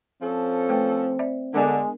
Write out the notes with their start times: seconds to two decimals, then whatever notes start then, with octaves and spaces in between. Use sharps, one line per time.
0.22 F3 C4 C#4 A4
0.69 A3 B4 G5
1.19 D5 E5
1.54 D3 G#3 B3 D4 A#4